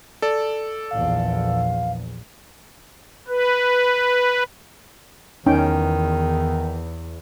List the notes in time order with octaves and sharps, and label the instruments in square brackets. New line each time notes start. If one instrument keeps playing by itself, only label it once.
[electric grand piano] A4 D5
[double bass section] A#1 E2 [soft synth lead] F5
[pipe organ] B4
[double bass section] E2 [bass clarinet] D#3 [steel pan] C#4 D#4 G5